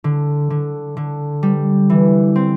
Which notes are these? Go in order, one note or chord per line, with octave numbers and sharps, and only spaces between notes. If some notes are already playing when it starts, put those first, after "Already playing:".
D3
D3
D3
G3
E3
C4